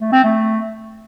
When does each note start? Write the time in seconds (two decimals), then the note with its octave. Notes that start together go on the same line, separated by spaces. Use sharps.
0.01 A3
0.13 C4
0.24 A3